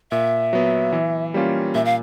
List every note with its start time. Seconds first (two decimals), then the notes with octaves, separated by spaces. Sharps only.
0.11 A#2 E5
0.53 F#3 B3
0.92 E3
1.34 G3 A#3 C#4 F4
1.75 A#2 E5
1.85 F5